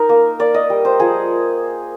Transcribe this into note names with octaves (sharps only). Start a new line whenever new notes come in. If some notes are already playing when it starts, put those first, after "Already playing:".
Already playing: D#4 A#4
A#3
A#3 D5
D#5
G3
C5
F3 G#4